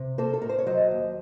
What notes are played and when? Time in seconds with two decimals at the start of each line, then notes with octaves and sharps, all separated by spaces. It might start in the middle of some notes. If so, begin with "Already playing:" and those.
Already playing: C3
0.18 A#3 A4 C5
0.34 A4
0.42 A2 A#4
0.49 C5
0.59 C#5
0.67 F#3 C5 D#5
0.91 D#2